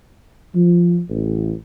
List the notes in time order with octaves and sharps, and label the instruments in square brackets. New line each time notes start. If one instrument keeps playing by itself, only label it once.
[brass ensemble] F3
A1